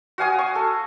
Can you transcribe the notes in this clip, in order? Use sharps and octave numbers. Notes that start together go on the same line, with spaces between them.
F#4 F5 G#5 D#6
C#6
A4